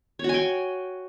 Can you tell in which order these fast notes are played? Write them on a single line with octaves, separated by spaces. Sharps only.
C#5 F#4 G#5 G5